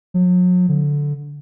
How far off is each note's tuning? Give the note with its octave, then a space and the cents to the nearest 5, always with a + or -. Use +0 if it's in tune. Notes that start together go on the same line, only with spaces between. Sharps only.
F#3 -40
D3 -10